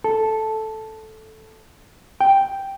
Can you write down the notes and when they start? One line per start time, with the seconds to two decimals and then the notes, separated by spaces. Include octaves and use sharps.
0.04 A4
2.21 G5